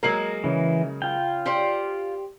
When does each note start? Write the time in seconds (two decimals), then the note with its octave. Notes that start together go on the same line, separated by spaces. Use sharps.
0.03 F#3 G#3 A#3 A#4 C7 F#7
0.44 C#3 E3
1.02 F4 G5
1.46 G4 C5 D5